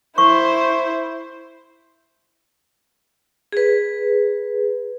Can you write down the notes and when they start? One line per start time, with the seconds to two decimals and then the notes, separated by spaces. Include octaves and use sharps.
0.18 E4 C5 C#6
3.52 G#4 B4